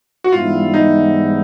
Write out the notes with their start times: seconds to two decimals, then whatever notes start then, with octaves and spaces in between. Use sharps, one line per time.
0.24 F#4
0.32 G#2 E3 G3 B3 E4 F4
0.74 D#4